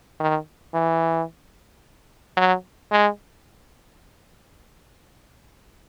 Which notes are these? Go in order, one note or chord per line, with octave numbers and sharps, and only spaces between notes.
D#3
E3
F#3
G#3